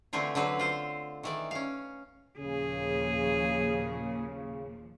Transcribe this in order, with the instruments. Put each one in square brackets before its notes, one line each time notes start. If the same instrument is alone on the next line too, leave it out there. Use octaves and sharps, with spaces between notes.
[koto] D3 E3 A3 C4 E4 F4
D3 F#3 C4 B4
F4 C5
D#3 E3 D5
C#4 F5
[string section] D#2 A#2 F3 [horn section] C#3 [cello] G#4